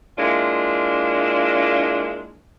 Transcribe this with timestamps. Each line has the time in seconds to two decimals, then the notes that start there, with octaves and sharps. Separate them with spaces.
0.18 G#3 A#3 D4 E4 F4